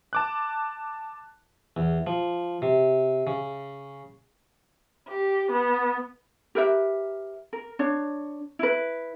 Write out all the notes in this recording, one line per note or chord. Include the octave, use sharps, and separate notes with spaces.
A5 D6 F#6
E2
F3
C3
C#3
G4
B3
G4 A#4 B4 E5
A#4
D4 C#5
E4 B4